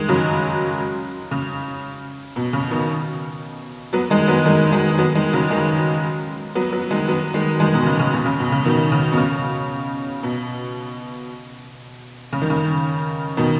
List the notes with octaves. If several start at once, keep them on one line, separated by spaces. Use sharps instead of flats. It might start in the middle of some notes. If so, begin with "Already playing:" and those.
Already playing: D#3 G#3
C#3 F#3
C#3
B2
C#3
B2 D#3
F#3 B3
D#3 G#3
F#3 B3
D#3 G#3
D#3 G#3
F#3 B3
D#3 G#3
C#3 F#3
D#3 G#3
F#3 B3
F#3 B3
D#3 G#3
F#3 B3
D#3 G#3
D#3 G#3
B2 D#3
C#3
C#3
B2
C#3
B2
C#3
B2 D#3
C#3
B2
C#3
B2
C#3
D#3
C#3
B2 D#3